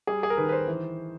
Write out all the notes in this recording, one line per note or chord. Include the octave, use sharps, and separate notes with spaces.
G3 G#4
G#4
A#4
D#3 B4
B4
C5
E3